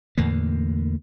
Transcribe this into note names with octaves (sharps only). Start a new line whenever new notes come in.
E2 A2 D3 A#3